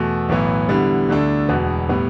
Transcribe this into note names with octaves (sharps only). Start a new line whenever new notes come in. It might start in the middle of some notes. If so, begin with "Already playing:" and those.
Already playing: E2 B2 A3
B1 A2 E3 B3
D3 G3 B3 E4
D2 D3 A3 D4
E1 E2 B2 B3
A2 G3 B3